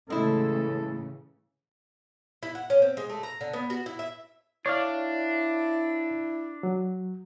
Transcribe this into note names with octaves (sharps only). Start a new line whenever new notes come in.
A2 C#3 E3 G#3 E4 A4
E4
F#5
C#4
C4
G#3
A3
A#5
D3
B3
F#4
E4
E5
D4 E4 C#5 D5 F5
F#3